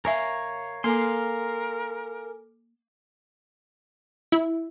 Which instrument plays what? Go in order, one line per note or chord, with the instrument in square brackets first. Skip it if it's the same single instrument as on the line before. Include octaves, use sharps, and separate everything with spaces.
[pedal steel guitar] A#4 C#5 F5 [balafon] E5 G#5
[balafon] A#3 [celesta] A4 G#5 D6 [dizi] A#4 [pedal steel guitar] F5 C6
[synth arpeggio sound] E4